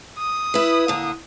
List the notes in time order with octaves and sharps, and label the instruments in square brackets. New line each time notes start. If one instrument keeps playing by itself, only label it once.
[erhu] D#6
[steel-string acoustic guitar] E4 B4
A#2 D3